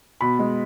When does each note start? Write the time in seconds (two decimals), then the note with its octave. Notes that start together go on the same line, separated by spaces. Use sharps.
0.21 B2 B5
0.39 G#3